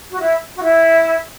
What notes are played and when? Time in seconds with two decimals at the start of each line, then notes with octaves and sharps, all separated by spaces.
0.10 F#4
0.20 E4
0.55 F#4
0.63 E4